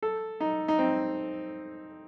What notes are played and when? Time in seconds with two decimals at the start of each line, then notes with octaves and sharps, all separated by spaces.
0.03 A4
0.40 D#4
0.68 D#4
0.79 C4